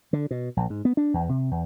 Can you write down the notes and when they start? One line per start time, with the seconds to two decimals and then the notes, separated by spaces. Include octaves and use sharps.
0.13 D3
0.31 B2
0.57 A#1
0.70 G#2
0.85 B3
0.97 D4
1.14 E2
1.29 C3
1.51 E2